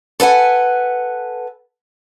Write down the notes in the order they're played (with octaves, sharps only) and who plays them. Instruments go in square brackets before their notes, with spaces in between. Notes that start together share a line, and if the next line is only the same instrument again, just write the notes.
[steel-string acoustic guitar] A4 B4 F#5 G#5